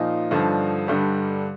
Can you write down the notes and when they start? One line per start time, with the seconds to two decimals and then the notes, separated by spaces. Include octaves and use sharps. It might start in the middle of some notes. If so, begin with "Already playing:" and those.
Already playing: A#2 F3 D#4
0.31 G2 D3 F3
0.88 G2 D3 G3